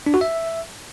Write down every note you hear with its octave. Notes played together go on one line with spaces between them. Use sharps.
D4
F#4
E5